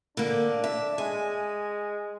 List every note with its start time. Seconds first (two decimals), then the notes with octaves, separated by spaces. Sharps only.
0.17 D3 A#3 D4
0.64 E5
0.98 G#3 G#5